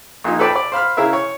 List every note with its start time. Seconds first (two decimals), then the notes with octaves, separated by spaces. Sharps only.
0.24 A#1 A#2 D#4
0.39 A4 B4 D5 G5 A5
0.56 D5
0.72 C5 F5 B5 F6
0.97 C#3 E4 G#4 A#4 E5
1.13 C#5